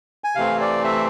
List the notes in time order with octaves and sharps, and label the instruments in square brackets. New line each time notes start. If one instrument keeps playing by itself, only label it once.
[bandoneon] G#5
C3 E3 A3 C4 F5
D5
E5